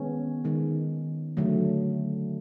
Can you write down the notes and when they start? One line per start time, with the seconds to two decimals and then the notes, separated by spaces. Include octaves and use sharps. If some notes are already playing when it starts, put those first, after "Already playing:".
Already playing: D#3 G#3 B3 C#4
0.44 D#3 G#3
1.37 D3 F#3 A3